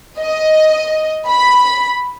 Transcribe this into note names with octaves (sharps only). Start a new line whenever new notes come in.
D#5
B5